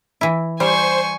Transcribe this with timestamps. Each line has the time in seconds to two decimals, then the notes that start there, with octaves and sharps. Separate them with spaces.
0.21 E3 E4
0.60 G3 C5 G#5 C#6